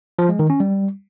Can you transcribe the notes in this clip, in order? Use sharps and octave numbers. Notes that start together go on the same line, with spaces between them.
F3
G#3
D#3
C#4
G3